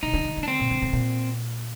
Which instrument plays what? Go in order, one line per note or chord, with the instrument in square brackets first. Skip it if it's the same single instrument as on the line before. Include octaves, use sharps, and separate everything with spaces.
[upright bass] C3 [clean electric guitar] D#4
[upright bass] D3
D#3
D3
[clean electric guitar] D4
C4
[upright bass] A#2
D3
A2
A#2